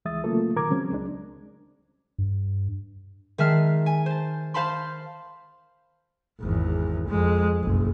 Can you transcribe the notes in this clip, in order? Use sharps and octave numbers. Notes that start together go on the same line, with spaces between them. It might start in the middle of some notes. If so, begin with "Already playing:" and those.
C#2 E3 G#3 E5 D#6 A6
C#3 F#3 A3 A#3 F4 A4
A#2 D#3 A#4 A#5 D6 G#6
C#3 F#3 G#3 C4 C#4
C#2 G#3 D4
G2
D#3 G#3 E5 A5 F6 C7
G#5
C5 A5
C5 F5 A5 B5 C6
G#1 E2
F2 G#3
F#1 B1